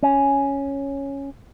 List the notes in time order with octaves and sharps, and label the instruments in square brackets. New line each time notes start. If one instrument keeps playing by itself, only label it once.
[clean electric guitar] C#4